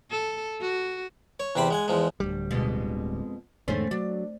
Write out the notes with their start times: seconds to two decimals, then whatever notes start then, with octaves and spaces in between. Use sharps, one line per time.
0.10 A4
0.61 F#4
1.40 C#5
1.56 E2 C3 G4 C5 B5 C6
1.70 G#3 F#5 G#5
1.88 E2 F3 G#3
2.20 D1 D2 G3
2.51 F2 B2 G#3
3.68 E2 G#2 D3 A3 C4 C#4
3.91 F#3 D4